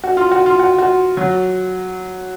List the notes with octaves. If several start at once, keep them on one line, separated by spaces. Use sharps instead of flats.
F#4
F4
F#4
F4
F#4
F#4
F#3